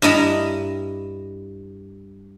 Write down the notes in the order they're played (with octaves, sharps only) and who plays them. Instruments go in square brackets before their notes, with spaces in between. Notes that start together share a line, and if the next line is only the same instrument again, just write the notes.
[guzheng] G2 E4 D#5 A#5